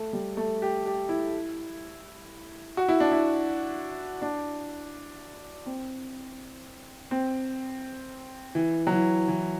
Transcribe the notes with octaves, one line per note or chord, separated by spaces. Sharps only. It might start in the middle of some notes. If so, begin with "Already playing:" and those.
Already playing: A3
G3
A3
G4
G4
E4
F#4
E4
D4
E4
D4
C4
C4
E3
F#3
E3
E3